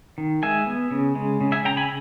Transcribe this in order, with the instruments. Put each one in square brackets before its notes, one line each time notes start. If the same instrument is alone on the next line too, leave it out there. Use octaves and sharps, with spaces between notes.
[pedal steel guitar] D#3
G#3 E5 G#5
B3
C#3
G#3
C#3
E5 G#5
C#3 G5 A#5
G#5 B5